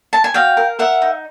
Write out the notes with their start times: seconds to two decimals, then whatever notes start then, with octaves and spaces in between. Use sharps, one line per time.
0.13 A5
0.24 G#5
0.34 F#4 F5 G5
0.57 A#4
0.79 A#4 E5 F#5
1.02 D#4